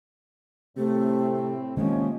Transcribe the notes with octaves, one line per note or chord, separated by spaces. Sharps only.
A2 C3 A3 C4
C3 D#3 F3 G#3 A#3 C#4 D#5